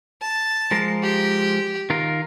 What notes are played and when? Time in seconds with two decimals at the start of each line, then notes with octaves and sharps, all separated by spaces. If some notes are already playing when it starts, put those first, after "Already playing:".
0.22 A5
0.71 F3 G#3 A#4
1.03 G4
1.90 D#3 F4 A#4